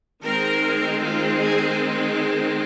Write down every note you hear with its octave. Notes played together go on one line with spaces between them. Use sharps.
D#3 G#3 C4 A#4
F4
G#4